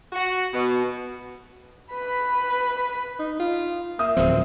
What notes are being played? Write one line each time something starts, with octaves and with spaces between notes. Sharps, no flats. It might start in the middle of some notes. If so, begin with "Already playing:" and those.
F#4
B2
B4 B5
D#4
F4
A#3 E5 D#6
D1 F3 C4